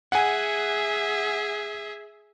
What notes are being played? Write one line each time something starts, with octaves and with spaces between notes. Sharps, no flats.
G#4 E5 F#5 G#5